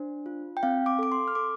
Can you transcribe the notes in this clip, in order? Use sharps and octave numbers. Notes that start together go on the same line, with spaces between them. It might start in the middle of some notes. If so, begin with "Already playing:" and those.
Already playing: D4 C5
F4
G5
C4 F5
D6
A4 D6
C6
F6
A4 D6